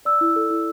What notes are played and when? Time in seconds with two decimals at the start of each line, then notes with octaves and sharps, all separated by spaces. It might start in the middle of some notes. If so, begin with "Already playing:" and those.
0.05 D5 E6
0.21 E4
0.36 A4
0.50 E4